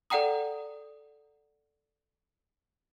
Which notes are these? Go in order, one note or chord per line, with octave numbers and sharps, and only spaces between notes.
A4 D5 F#5 G5 A#5 D#6